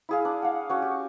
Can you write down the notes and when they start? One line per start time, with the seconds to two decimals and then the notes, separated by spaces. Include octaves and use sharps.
0.09 E4 G#4 F5
0.25 D4
0.42 F5 F#5
0.70 C#4 F#4
0.82 G4